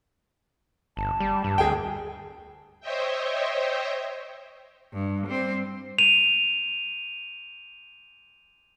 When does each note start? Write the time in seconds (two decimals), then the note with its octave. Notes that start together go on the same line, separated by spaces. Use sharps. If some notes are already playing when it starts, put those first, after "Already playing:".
0.97 G1 A5
1.20 G3
1.44 G2
1.58 D2 G#4 G5
2.80 C5 C#5 D#5 E5 G5
4.93 G2
5.26 G3 C4
5.98 D#7 F7